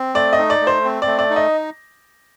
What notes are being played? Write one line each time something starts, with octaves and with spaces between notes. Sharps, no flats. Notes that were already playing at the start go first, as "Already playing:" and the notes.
Already playing: C4
A3 D5
D#5
D#4
D5
A3
C5
C4
A3 D5
D5
D#4
D#5